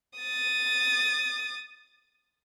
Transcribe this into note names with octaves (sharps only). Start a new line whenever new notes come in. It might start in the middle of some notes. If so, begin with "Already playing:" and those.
D#6 A6